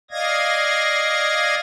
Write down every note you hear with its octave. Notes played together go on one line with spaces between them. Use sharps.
D5 D#5 F5 G#6 A#6